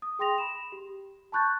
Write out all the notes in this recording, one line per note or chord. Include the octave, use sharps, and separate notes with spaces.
D#6
G#4 G5 C6 D#6 A#6 F7
B5 E7
G4
A5 B5 C#6 F#6 G6 A6